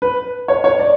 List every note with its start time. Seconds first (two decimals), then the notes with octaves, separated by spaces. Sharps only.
0.02 B4
0.48 C#5
0.64 C#5
0.79 D5